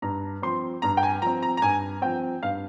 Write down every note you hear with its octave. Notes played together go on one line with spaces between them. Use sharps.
G2 A#5
F3 C4 C6
G2 A#5
G5
G#5
F3 C4 A#5
A#5
A#5
G2 G#5
F3 C4 G5
G2 F5